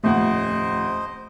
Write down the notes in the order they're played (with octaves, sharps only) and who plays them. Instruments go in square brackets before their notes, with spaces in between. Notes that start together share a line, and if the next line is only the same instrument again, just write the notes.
[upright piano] D#1 F2 F#5 [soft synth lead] A3 [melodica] C5 D#5